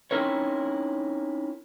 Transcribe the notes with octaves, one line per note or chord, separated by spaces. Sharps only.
C4 C#4 D#4 E4 A#4 C#5